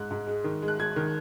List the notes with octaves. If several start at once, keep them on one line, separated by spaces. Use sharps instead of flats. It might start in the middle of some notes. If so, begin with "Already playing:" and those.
Already playing: G#2 G#3 F#6
G#2
G#3
D#3
G#3
F#6
G#3 G#6
D#3